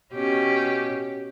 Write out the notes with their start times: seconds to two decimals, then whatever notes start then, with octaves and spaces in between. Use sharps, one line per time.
0.14 B2 C#4 G4